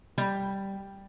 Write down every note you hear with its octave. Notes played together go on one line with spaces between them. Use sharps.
G3